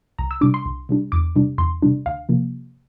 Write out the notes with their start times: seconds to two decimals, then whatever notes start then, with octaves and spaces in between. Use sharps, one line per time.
0.19 C2 A#5
0.31 E6
0.41 C3 G3 D4 D6
0.54 C6
0.66 C2
0.89 C3 G3 D4
1.12 E2 D6
1.36 C3 G3 D4
1.58 E2 C6
1.82 C3 G3 D4
2.06 D2 F5
2.29 C3 F3 A#3